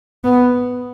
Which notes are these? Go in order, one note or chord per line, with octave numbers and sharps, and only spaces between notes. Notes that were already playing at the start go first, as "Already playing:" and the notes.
B3